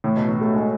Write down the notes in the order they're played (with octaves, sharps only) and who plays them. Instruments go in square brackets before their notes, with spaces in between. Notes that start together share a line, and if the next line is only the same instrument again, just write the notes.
[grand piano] A2
B2
F#3
A3
G#3